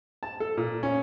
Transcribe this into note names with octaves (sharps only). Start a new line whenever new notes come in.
A5
A4
A#2
C#4